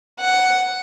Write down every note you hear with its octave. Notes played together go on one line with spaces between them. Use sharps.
F#5